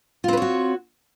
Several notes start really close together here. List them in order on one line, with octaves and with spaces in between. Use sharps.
F4 C4 B4 C#5 F#4